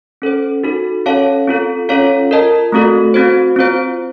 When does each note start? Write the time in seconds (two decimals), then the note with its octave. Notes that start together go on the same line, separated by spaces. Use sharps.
0.22 C#4 A4 C5
0.64 D#4 F#4 A4
1.06 C#4 A4 C#5 F5 A5
1.48 C4 F4 A4
1.89 C#4 F4 A4 C#5 F5
2.31 F4 A#4 D#5 A5
2.72 A3 C4 F#4 A4
3.14 C4 F#4 C5
3.56 C4 F4 C5